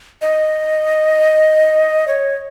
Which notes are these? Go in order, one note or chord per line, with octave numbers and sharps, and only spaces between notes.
D#5
C#5